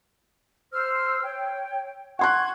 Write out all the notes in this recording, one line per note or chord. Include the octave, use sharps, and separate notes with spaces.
C5 E6 F6
C#5 G5
F#5 C6 C#6 F#6 G#6